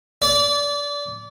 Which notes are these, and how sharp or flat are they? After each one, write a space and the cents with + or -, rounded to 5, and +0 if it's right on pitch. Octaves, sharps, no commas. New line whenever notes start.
D5 -25